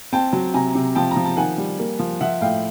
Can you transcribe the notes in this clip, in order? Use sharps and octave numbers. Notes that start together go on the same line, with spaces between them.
C4 G5 A5
F#3
C3 G#5 A#5
C3
F3 G5 A5
A#5
F3
A5
D#3 F#5 G#5
G3
A#3
F3
F3 E5 F#5
A2 F5 G5